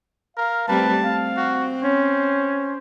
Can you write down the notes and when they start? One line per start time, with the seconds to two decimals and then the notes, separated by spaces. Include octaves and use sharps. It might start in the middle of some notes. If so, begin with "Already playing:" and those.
0.37 A#4 F5
0.68 G3 A3 C4 B4 A5
1.02 C4 F5
1.37 F#4
1.83 C#4 C5